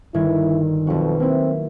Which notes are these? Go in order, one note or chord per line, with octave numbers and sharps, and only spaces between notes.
G1 D#3 E4 G#6
B1 F2 F#4
A#3 C4 E4